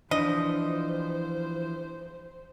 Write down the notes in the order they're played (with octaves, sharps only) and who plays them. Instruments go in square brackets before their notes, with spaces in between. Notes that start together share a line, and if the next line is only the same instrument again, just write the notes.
[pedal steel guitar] E3 F3 [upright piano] D4 [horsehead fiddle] C5 [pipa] D#5